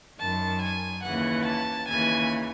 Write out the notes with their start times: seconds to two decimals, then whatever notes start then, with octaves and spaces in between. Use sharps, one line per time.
0.19 F#2 D#3 A5
0.62 G#5
1.04 D#2 C#3 E3 F#5
1.46 A5
1.89 D#2 C#3 E3 G#5